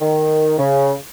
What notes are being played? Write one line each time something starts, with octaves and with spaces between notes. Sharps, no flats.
D#3
C#3